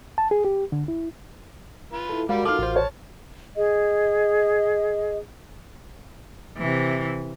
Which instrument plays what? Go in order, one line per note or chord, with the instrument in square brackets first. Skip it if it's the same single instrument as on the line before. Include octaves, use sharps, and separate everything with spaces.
[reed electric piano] A5
G#4
G4
D3
E4
[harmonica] F4 B4
[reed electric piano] E4 A4
[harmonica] G3 D5 B5 [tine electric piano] G#3 [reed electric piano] F#4 A#4 [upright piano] F5
[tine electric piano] D#4 A4 [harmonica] F4 F5 [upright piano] D6 F6
[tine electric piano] A1 C5
[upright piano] C#5 [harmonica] A5
[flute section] G#4 D#5
[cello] C3 E3